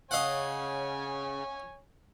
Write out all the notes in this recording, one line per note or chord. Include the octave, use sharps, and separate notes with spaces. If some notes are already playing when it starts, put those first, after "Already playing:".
C#3 C#5 D#5 F5 F#5 G#5